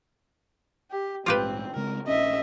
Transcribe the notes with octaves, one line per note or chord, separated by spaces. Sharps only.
G4
A#1 G#2 C4 F4 G4 B4
C#3 G#3 C4 A#4
A#1 C#4 D#5 E5